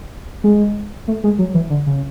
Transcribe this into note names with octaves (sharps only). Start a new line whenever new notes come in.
G#3
A3
G#3
F#3
E3
D3
C#3